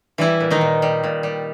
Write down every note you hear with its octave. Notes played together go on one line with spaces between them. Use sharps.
E3 G3 E4
A#2
D#3 D#4
A#2
G3
A#2
G3